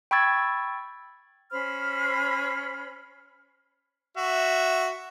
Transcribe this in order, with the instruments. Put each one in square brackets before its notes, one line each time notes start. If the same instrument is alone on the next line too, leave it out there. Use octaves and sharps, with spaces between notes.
[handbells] G5 B5 C#6 E6 G#6 A6
[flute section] C#4 C5 B5 F6
[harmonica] F#4 [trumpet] E5